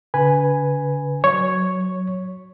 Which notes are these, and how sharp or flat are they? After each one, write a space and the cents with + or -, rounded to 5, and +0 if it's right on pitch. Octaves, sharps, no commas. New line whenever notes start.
D3 -40 B4 +0 G#5 +0
F#3 +0 C#5 +0